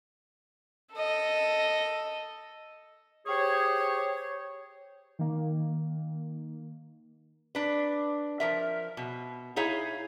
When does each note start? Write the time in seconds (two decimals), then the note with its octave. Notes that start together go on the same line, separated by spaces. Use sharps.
0.94 A4 D#5
3.26 G4 G#4 C5 C#5
5.19 D#3 A#3
7.55 D4 B4
8.40 F3 A#4 E5
8.97 B2
9.56 D#4 E4 G#4 C#5 F5